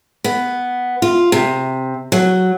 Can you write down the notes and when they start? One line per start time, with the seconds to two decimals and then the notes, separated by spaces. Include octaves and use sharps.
0.24 B3
1.02 F4
1.32 C3
2.12 F#3